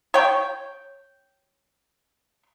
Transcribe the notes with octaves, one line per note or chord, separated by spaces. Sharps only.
C#5 G5